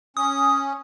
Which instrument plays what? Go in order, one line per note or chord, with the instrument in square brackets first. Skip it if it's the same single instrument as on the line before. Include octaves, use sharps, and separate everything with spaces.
[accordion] C#4 [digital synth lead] D#6